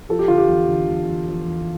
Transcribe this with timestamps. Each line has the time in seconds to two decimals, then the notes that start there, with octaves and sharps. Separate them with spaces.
0.09 F3 A4
0.19 G4
0.28 D3 F4
0.38 G4
0.49 E2
0.69 D3
0.88 E2
1.08 E2
1.27 F3
1.47 E2